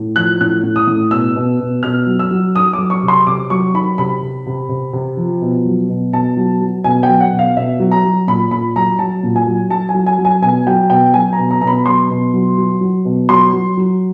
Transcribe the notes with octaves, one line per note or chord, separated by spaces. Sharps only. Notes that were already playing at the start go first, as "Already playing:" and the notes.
Already playing: A2
F3 F#6
A2 F#6
A2
D#6
A2
B2 E6
B2
B2
B2 F6
F#3
E6
F#3
D#3 D#6
D6
F#3
C#6
C3
C6
C3 D6
F#3 C#6
D#3 B5
C3 B5
C3
C3
C3
C3
F3
B2
F#3
B2
B2 A5
F#3
F#3
B2 G#5
G5
F#3
F#5
B2
F5
B2 E5
F#3
A#5
F#3
A#2 B5
A#2 B5
F#3 A#5
F#3 A5
A#2
G#5
F#3
F#3 A5
G#5
F#3
G#5
F#3
G#5
B2 G#5
F#3 G5
B2 G5
F#3 G#5
A#5
B2
A#5
B2 A#5
B5
F#3 C6
B2
F#3
F#3
F#3
B2
F#3 C6
F#3
F#3